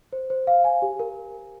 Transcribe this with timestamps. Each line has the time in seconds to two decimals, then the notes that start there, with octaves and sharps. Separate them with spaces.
0.13 C5
0.30 C5
0.47 F5
0.64 G#5
0.82 G4
0.99 A#4